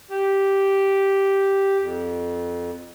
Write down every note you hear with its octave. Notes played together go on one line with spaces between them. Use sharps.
G4
F2